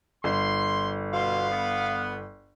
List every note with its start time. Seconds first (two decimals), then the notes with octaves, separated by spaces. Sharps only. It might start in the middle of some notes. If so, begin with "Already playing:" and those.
0.24 G1 C6
1.13 B2 F5 C6
1.51 B3